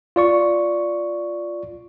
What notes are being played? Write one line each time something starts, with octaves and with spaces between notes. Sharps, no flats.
F4 D5 C#6